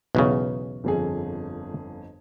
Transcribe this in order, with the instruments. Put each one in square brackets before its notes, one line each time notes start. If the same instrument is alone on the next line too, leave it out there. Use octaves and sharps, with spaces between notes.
[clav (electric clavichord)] B1 E2 C#3
[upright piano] G1 F2 G#4